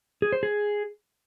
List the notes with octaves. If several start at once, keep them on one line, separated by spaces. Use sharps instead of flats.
G#4
C5
G#4